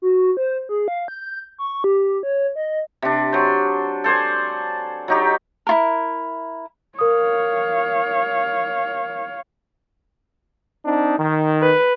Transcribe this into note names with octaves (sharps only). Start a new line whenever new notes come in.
F#4
C5
G#4
F5
G6
C#6
G4
C#5
D#5
C3 D4
F#3 C5
A4 C5 D5 G#5
F#3 D#4 G4
E4 F4 A#4
A#4 C#5 F5 D#6
C4 D4 D#4
D#3
B4